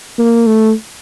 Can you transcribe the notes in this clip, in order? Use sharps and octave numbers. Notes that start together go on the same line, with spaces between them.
A#3
A3